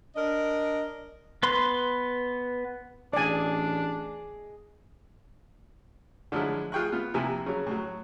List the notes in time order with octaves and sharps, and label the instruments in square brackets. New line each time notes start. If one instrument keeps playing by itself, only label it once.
[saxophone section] D4 A#4 D#5
[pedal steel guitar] B3 B4 C6
[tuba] A1 [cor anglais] D4 [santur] G#4 D#5 D#6 [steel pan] D5 G#5
[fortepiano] D3 F3 F#3 G#3 E4
F4 G#4 G5 C#6 F#6
B3 F4
C3 F3 A#3 E4 G#5
C#3 F#3
A2 F#3